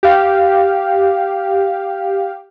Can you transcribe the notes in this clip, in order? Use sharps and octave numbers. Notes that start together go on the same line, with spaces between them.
G4 F5